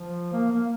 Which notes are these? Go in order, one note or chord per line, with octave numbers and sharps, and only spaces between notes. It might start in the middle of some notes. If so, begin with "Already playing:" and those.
Already playing: F3
A#3
A#3